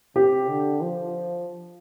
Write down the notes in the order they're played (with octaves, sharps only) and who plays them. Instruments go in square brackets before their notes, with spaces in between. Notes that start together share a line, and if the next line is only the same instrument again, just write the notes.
[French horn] C3 [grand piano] G4
[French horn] D3
F3